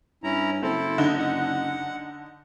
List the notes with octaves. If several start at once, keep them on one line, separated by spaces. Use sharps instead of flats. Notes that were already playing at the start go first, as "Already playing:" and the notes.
G2 C#4 E4 A#5
F#1 C4 E4 A4
D3 D#4
F#5